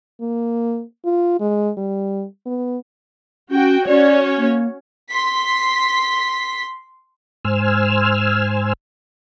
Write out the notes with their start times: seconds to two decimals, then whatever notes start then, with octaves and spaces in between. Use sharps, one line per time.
0.21 A#3
1.05 F4
1.40 G#3
1.77 G3
2.46 B3
3.51 C#4 F#4 G5
3.87 C#4 F#4 C#5 D5
4.38 A#3
5.09 C6 B6
7.45 G#2 C5 G#5 E6 F6